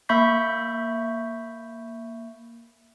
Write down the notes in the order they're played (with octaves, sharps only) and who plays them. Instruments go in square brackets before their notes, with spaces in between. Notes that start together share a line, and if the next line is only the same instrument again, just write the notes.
[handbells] A#3 E5 B5 C#6 G6 B6